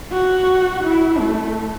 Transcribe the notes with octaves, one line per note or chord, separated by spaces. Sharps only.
F#4
E4
A3